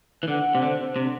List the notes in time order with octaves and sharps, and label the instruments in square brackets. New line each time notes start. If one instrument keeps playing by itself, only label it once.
[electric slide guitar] E3
[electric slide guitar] D3 [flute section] F#5
[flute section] D4
[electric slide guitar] C3
[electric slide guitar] D3 [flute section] C5
[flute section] C5
[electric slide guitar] C3 [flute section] D4